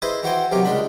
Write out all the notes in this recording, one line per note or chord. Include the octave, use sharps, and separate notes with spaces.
E4 G#4 B4 C5 D#5
E3 F#4 C5 G5 G#5
B1 C3 F#3 G4 A#4
C#2 G3 G#3 D4 B5